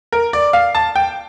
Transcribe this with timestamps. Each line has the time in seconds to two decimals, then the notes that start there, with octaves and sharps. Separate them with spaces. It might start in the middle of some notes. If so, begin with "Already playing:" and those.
0.12 A#4
0.33 D5
0.53 F5
0.75 A5
0.96 G5